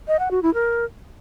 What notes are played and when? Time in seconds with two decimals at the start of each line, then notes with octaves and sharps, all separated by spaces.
0.08 D#5
0.19 F#5
0.31 F#4
0.43 E4
0.54 A#4